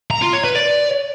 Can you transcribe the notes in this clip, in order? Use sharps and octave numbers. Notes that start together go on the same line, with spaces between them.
A#5
F4
C#5
B4
D5